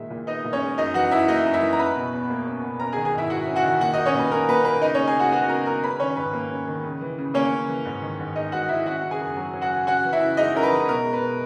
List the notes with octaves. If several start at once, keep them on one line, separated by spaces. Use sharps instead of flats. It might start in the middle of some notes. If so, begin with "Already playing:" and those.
Already playing: A#2 D#3 G#3 E5
A#2
B3 D#4 D#5
A#2
C#4 C#5
G#3
F#2 D#4 D#5
E3 F#4 F#5
F#2 E4 E5
A#3 D#4 D#5
F#2
E4 E5
E3
A#5
C#4 B4 B5
B2
E2
A#3
C#4
B2
C#4 A#4 A#5
G#4 G#5
D#3
G#4 G#5
G#2 E4 E5
G#3 F#4 F#5
C#4
F#4 F#5
D#3
A#2 F#4 F#5
A#3 D#4 D#5
C#4 C#5
A#2 B4
C#4 A#4
A#2 B4
A#3 B4
C#3 D#4 D#5
G#3 C#4 C#5
G#4 G#5
C#3 F#4 F#5
B3 F#4 F#5
C#3 A#4 A#5
G#3 A#4 A#5
C#4 B4 B5
D#3 C#4 C#5
G#2 B4
A#3
C#4
D#3
C#3
E3
C#3
A#3 C#4 C#5
C#3
E3
G#2
D#3
G#2
G#3 D#4 D#5
G#2 F#4 F#5
D#3 E4 E5
C#4 F#4 F#5
C#3 F#5
G#4 G#5
F#2
F#3
C#4
F#4 F#5
C#3
C#4 F#4 F#5
E3
E4 E5
C#3
G#3 D#4 D#5
C#4 A#4
B4
E3
B2 A#4
G#3
B4
B2